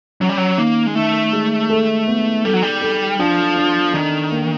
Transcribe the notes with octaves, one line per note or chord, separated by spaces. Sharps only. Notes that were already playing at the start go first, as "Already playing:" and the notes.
F#3 C#4
G3
F#3
D#3 A#3
G#3
D#3 A3
G#3
A4
B3
G3 A4
F#3
G3
A4
F3 D4
D4
D#3 D4
A#3